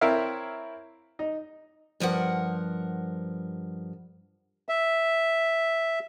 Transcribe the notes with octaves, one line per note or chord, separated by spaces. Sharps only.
C4 E4 A#4 C#5 E5 F5
D#4
G2 F3 A#4 F#5
E5